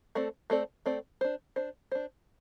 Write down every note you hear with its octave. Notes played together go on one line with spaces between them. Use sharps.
A3 C4 A4 D5
A3 C4 A4 D5
A3 C4 A4 D5
D4 C5
D4 C5
D4 C5